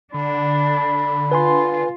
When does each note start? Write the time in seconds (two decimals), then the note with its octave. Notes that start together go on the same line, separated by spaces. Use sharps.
0.14 D3 D4 B5
1.32 F4 B4 G#5 C6